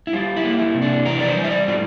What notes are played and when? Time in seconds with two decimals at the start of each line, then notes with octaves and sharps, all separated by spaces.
0.07 E4
0.13 G3 F4
0.36 E4
0.44 A#3
0.59 E4
0.75 C3
0.82 D4
1.05 E3 A#4
1.21 D5
1.28 C5
1.36 G3
1.44 E5
1.51 D5
1.67 A2 F4